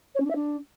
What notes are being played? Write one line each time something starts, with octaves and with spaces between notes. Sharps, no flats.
C#5
C#4
D4
E5
D4